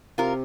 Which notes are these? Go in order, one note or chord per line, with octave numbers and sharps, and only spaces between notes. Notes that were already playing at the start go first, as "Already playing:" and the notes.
C3 F4 A#4